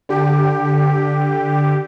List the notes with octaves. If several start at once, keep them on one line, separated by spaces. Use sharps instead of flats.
D3 G4